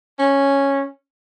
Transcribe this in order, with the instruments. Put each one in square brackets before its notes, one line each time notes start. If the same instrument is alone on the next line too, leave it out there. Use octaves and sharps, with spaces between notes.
[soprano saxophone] C#4